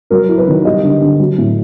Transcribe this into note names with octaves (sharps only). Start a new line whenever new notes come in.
F#3 A#4
E4
B4
D#3
G3 D#5
D3
D3
F#3
A2